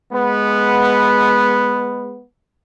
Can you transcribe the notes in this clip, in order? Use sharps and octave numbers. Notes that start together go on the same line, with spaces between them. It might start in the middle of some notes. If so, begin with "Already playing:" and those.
G#3 B3